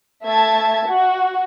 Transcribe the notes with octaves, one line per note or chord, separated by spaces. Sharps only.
A3 E5 A5 G#6
F#4